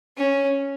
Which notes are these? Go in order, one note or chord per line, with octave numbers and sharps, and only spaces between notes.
C#4